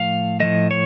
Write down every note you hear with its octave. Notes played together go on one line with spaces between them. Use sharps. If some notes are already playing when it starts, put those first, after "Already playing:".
Already playing: A2 F3 A3 F5
A2 F3 A3 D#5
C#5